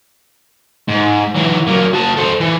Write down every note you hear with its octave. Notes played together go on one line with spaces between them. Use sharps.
G#2
E3 F#3
F#3 A#3
F#4 A5
A4 C5
E3